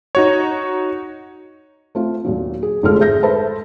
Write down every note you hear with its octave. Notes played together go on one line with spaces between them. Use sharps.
D#4 F#4 C#5
A3 C4 F4
D#2 A#2 F#3
G#4
F1 D3 G#3 F4 A4 F6
G#1 G#4 E5 G6 A#6
A4 B4 C5 E5 A5 B5